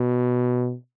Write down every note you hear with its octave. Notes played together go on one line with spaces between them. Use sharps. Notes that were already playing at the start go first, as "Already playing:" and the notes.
Already playing: B2